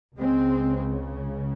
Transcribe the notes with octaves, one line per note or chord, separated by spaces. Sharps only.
C#2 C#3 G#3 C4